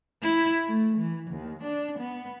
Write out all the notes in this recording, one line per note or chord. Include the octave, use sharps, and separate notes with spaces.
E4
A3
E3
D#2
D4
B3